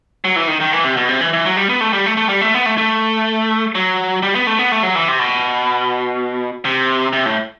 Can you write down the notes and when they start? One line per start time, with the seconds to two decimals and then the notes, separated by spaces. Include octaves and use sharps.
0.25 F#3
0.36 E3
0.48 D#3
0.61 D#3
0.73 E3
0.84 C3
0.97 B2
1.09 C3
1.21 E3
1.33 E3
1.45 F#3
1.57 G3
1.69 B3
1.81 A3
1.93 G3
2.06 A3
2.17 A3
2.29 G3
2.41 A3
2.54 B3
2.66 A3
2.78 A3
3.75 F#3
4.23 G3
4.35 B3
4.47 A3
4.59 B3
4.72 A3
4.83 F#3
4.95 E3
5.08 C3
5.19 B2
6.65 C3
7.13 C3
7.26 A2